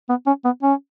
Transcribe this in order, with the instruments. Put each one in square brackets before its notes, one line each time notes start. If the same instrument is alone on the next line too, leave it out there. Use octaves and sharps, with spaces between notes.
[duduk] B3
C#4
B3
C#4